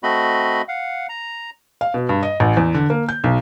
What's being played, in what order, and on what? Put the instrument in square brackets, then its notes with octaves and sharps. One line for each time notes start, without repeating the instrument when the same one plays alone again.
[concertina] A3 C4 F#4 D#5 B5
F5 F#5
A#5
[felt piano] F5
B2
G2
D#5
A1
E2
D3
A#3
G6
B1